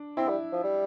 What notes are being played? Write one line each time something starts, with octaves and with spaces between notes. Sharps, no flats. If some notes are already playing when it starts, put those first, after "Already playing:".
Already playing: D4
C4 E4
G3
F3
G3